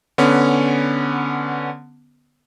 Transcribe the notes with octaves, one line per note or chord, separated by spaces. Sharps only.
D3 B3 C#4